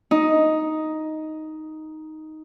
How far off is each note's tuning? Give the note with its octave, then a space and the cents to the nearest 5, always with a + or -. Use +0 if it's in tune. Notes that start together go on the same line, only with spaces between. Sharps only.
D#4 +5